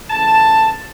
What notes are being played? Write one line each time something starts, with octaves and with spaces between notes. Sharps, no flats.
C#3 E3 A3 A5